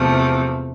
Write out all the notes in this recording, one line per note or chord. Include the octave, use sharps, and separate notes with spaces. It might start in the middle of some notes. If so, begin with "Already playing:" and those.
Already playing: E2 C3 F3 A3